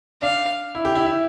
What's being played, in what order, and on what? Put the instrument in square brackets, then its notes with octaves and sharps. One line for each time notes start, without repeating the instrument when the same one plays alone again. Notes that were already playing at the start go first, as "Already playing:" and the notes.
[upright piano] D4 [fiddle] F5
[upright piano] E4
G4
E4
E4